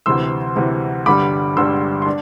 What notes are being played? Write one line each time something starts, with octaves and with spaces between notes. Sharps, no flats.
D2 C3 E3 C6 E6
D2 C3 E3
G1 G2 D3 G3 B5 D6
G1 G2 D3 G3 C6 E6
C6
D4